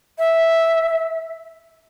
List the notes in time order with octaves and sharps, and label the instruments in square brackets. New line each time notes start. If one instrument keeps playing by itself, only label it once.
[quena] E5